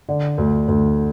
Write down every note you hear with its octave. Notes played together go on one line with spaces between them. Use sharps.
D3
D2
D2